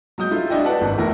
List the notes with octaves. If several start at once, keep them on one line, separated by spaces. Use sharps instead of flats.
F#3 G#3 D#6 G6
E4 F4 A4
D4 E4 F#4 D5 D#5 G5
A4 B4 D5 F#5 A5
G#1
A#1 E2 A3 E4 A#4 A#6